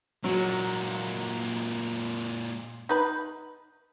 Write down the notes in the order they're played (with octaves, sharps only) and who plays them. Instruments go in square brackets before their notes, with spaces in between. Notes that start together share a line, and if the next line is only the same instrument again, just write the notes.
[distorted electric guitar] A#2 G#3 [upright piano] F#3
[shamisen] D#4 B4 B5